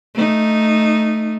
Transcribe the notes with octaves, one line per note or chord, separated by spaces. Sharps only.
A3 D#4